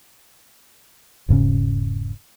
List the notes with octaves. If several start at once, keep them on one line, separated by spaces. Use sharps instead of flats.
E1 G#2 C#3 C#4